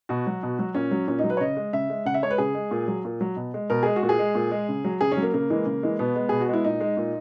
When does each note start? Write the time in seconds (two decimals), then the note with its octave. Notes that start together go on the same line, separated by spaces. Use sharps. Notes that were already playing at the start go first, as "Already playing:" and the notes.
0.09 B2 F#4
0.27 F#3
0.43 B2
0.59 F#3
0.75 A#2 C#4
0.91 F#3
1.08 A#2 C#4
1.19 D#4
1.24 F#3
1.30 B4
1.37 C#5
1.40 C#3 D#5
1.57 G#3
1.73 C#3 E5
1.90 G#3
2.06 C#3 F#5
2.14 E5
2.23 G#3 C#5
2.31 B4
2.38 C#3 G#4
2.55 G#3
2.71 A#2
2.88 F#3
3.05 A#2
3.21 F#3
3.36 B2
3.54 G#3
3.70 B2 A#4
3.83 G#3 G#4
3.96 F#4
4.03 A#2
4.09 G#4
4.19 G#3
4.35 A#2
4.51 G#3
4.69 C#3
4.84 F#3
5.01 C#3 G#4
5.12 C#4
5.17 F#3
5.22 A#3
5.34 C#3 A#3
5.50 E3 G#3
5.66 C#3
5.83 E3 G#3
5.99 B2 B3
6.16 G#3
6.29 B2 G#4
6.41 F#4
6.49 G#3 E4
6.64 A#2 D#4
6.81 G#3
6.97 A#2